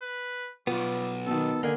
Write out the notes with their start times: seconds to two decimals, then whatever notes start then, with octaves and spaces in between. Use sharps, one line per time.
0.02 B4
0.67 B1 G3 B3 F4
1.27 B2 D#3 A4
1.63 D3 A#3 G#4 A#4 F#5